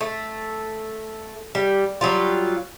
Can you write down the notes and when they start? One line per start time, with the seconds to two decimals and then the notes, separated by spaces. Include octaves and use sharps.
0.01 A3
1.55 G3
2.01 F#3 G3 F4